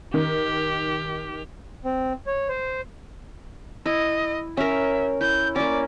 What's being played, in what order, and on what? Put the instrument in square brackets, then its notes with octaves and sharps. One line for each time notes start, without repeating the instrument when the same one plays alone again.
[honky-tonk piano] D#3 [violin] G4
[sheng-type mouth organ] C4
C#5
C5
[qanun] E4 [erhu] D#5
[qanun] C#4 A#4 [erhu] E5
[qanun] E4 [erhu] G6
[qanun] A#3 C#4 [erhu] D5